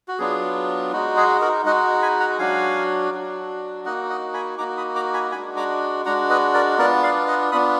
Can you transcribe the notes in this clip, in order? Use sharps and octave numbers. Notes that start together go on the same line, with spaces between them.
F#4
F#3 B3 D4 F4 G#4
G#3 D#4 F#4
G#4
F#4 A#4
G#3 D#4 F#4 D#5 F#5
G#5 B5
F#5 A#5
F#3 D4 F#4 F5 G#5
F#3 D4 F#4
A#3 D#4 F#4 D#5 F#5
D#5 F#5
G#5 B5
A#3 D#4 F#4 A#5 D6
B5 D#6
A#5 D6
G#5 B5
G#3 D4 F#4 G#5 B5
A#5 D6
G#3 D4 F#4 F#5 A#5
B4 D#5
A#4 D5
B3 D4 F4 A#4 D5
D5 F5
D#5 F#5
B3 D4 F4 B5 D#6